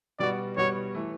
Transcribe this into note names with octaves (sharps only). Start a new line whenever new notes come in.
B2 G3 B3 F#4 D5
B2 G3 B3 F#4 C#5
E3 A3